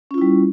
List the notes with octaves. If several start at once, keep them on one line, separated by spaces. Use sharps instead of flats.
G3 C#4 E4 F4